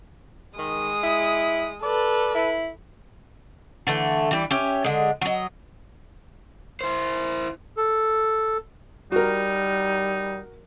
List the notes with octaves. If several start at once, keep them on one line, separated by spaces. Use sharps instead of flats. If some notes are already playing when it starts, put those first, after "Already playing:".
D#3 G#3 D#6
E4
A4 B4 D5
E4
D3 E3 A3
E3 G3
C#4 G4 E5
D3 G#3
F#3 D#5
E4 C5
A4
G3 D#4 F#4 A#4